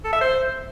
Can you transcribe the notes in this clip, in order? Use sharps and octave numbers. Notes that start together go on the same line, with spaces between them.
A4
E5
C5